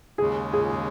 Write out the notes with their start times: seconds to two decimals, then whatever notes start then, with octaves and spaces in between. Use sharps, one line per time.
0.18 D#2 C#3 G#3 G#4
0.53 G#4